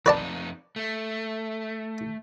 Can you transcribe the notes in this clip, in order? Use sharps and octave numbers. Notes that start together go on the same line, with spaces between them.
F2 D#4 B4 D5 A5
A3